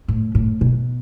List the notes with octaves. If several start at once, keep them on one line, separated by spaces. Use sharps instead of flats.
A2
A2
B2